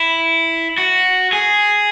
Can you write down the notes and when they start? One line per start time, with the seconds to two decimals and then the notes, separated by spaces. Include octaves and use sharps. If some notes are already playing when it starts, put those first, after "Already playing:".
Already playing: E4
0.78 F#4
1.33 G#4